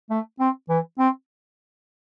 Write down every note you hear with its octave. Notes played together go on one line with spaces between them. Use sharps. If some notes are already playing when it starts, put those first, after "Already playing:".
A3
C4
E3
C4